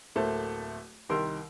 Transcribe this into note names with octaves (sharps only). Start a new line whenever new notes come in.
D1 A3 A#3 C5 A5
C2 D#3 G4 A#4 C6 E6